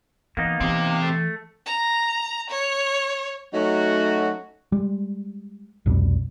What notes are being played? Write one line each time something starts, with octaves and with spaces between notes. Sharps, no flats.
E3 A#3 B3 D#4
E3 C4 G4
A3
A#5
C#5
F#3 A3 C#4 D#4 F#4
G3 G#3
C2 F2 B2 G3